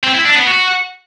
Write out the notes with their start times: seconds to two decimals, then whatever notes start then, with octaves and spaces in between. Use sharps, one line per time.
0.04 C4
0.14 E4
0.25 D4
0.36 B3
0.47 F#4